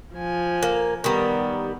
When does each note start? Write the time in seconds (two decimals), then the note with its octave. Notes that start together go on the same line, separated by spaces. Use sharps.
0.13 F3 G#5
0.63 A#3
1.04 D#3 G3 B3